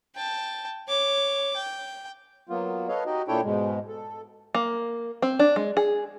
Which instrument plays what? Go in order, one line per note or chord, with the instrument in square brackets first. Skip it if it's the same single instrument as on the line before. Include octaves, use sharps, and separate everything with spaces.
[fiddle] G5 A5
C#5 D6
G5
[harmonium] F#3 A#3 B3 F4
A4 B4 C#5 D#5 F5
D#4 F#4 G4 D#5
A#2 D4 E4 A4 C#5 G5
G#2 B2 G#3
A4
[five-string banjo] A#3
C4
D4
G#3
G#4